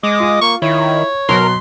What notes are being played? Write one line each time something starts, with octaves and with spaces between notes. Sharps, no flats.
G#3 D#5 D6 D#6
F4
A#3 C#6
D#3 E4 C#5
B2 F#3 A#4 C6